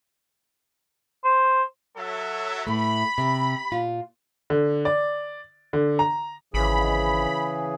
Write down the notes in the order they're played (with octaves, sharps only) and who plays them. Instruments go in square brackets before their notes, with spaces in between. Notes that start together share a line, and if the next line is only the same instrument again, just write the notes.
[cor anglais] C5
[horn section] F#3 A4 E5
[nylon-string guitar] A2 A3 [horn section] B5
[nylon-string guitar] C3
A#2 F4
[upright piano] D3
D5
D3
A#5
[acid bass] G#1 [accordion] C#3 E3 G#4 [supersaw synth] B5